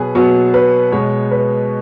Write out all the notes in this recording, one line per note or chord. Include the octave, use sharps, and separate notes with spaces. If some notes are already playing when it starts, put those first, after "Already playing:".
Already playing: B2 F#3 B3 G#4 B4
B2 F#3 B3 F#4
B4
B2 G#3 B3 C#5
B4